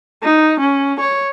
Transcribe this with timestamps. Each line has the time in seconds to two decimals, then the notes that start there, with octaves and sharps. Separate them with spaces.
0.23 D#4
0.60 C#4
1.00 C#5